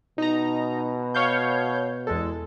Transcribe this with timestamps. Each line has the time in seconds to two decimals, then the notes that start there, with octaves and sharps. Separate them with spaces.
0.18 B2 D#4 A#5
1.15 C#5 F5 G6
2.07 E2 G#3 A4